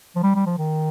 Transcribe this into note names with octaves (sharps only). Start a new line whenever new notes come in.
F3
G3
G3
F3
D#3